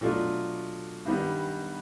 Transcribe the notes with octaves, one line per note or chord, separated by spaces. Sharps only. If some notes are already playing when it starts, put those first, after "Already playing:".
B2 F#3 A3 D4 F4
G2 D#3 G3 B3